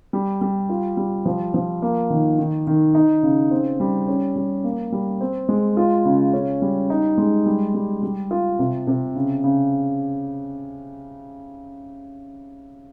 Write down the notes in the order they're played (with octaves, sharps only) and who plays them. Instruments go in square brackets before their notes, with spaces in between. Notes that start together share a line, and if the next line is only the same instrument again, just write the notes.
[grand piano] G3
G3
F4
G3
F3
F3
A#3
D#3
D#3
D#3
D#4
C#3
C4
G3
C#4
G3
A#3
G3
C4
G#3
F4
C#3
C#4
G3
D#4
G#3
G3
G3
G3
F4
C3
C3
C#3
C#3